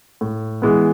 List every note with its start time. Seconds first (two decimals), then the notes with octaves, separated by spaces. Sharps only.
0.21 A2
0.62 E3 G#3 B3